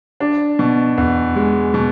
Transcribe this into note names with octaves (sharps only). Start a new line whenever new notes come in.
D4
B2
E2
G#3
B2